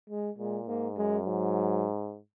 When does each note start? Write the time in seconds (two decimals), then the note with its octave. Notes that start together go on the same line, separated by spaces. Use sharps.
0.10 G#3
0.38 A#2 G#3
0.67 G#2 A#3
0.97 F#2 G#3
1.25 G#2 F#3